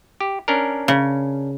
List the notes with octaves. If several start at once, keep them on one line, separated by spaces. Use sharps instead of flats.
G4
C#4 D4 A#4
C#3